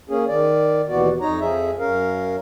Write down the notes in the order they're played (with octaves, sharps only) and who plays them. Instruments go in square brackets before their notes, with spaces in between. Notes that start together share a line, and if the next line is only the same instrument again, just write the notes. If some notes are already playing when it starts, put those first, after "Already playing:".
[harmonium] A#3 C#4 G#4
D#3 D5
D#2 B2 E3 B3 F#4 D5
F2 D#4 C#5 A#5
F2 F3 G#4 E5
F#2 C#4 A#4 F5